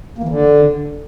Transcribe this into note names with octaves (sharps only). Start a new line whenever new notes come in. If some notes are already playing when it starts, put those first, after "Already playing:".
A#3
E3
D3